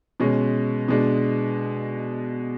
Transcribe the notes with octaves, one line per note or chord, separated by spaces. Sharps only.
B2 G#3 C#4
B2 G#3 D4